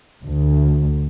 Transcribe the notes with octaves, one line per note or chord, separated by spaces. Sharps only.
D2